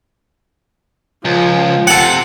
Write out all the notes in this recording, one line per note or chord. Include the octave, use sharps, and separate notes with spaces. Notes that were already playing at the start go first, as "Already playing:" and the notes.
C#2 F3
C3 A4 F#5